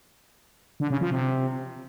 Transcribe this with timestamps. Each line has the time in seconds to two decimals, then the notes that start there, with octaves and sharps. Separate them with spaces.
0.80 D3
0.90 C#3
1.01 F3
1.11 C3